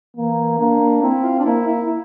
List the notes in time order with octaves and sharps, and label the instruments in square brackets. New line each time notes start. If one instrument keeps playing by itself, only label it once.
[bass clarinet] E3 [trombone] A#3
[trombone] A#3 [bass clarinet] D4
[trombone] C4 [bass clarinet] E4
[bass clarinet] F4
D4
[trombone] A#3 [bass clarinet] E4
[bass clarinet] E4
E4